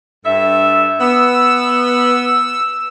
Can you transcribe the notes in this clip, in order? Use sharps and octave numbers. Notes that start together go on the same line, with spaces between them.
G2 A4 E5
B3 E6